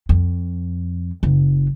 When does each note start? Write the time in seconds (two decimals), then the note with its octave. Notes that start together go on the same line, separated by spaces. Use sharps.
0.09 F2
1.23 F#1